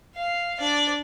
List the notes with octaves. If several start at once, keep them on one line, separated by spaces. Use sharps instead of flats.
F5
D4 D5